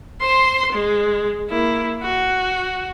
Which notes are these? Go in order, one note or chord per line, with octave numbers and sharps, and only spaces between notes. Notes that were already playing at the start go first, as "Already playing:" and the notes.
C5 C6
G#3
A#3 E4
F#4